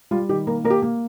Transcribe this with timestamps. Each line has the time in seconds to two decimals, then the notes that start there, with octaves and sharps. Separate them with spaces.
0.11 G3 F4
0.29 D#3 G4
0.47 A#3 A#4
0.64 A#3 A#4
0.70 G4
0.82 A#3